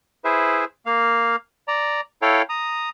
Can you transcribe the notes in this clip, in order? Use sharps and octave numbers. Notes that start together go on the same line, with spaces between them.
E4 G#4 B4 C5 E5
A#3 F5
D5 A#5
E4 A4 C#5 F5 G5
A#5 D#6